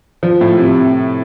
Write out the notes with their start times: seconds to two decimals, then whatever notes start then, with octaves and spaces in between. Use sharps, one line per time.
0.23 F3
0.41 A2
0.58 C3